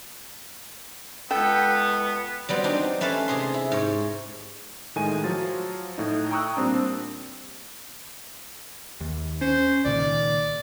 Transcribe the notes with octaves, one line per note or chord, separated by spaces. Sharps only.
C#2 B3 A4 G5
F#3 G3 B3 C4
C4 D4 D#4
A3 C#4 B4 C#5 F5 A5
C3 G#4 C6
E4
G#2 C#5
A2 D#3 G#3 D#4 G#5 D#7
F3 F#3 F4 A6
A2 D#4
G5 A#5 C#6 D#6 E6 F#6
A#2 G3 C4 D4
D#2
C#4 C5
C#2 A#2 D#3 D5